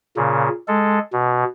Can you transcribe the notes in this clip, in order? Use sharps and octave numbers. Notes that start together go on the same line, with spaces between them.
A#2 C#3
G#3 A4
B2